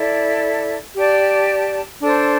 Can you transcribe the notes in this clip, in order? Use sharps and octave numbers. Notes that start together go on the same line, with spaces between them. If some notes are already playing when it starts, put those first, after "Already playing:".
Already playing: E4 A4 D5
G4 D5 A5
D4 A4 C5